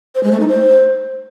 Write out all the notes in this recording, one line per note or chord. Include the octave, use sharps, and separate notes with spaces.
C5
G#3
A3
D#4
C5